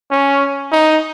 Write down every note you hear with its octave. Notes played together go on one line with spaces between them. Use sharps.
C#4
D#4